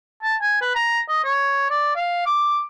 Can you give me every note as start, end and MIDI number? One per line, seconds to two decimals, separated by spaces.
0.23 0.36 81
0.42 0.59 80
0.61 0.71 71
0.75 1.00 82
1.09 1.21 75
1.24 1.67 73
1.70 1.90 74
1.96 2.26 77
2.26 2.62 86